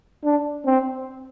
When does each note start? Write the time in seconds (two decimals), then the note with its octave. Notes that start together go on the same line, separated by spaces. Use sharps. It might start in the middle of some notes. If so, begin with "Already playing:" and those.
0.24 D4
0.66 C4